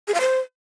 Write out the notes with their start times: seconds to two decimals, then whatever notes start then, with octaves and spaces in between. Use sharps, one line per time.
0.08 G#4
0.14 F5
0.20 C5